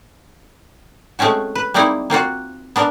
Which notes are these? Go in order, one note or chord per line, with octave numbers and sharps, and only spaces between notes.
G#3 A3 C4 C#4 F#4
B4
G3 G#3 A#3 C4 D#4 E4
A#3 C4 F4 F#4
B3 D4 A#4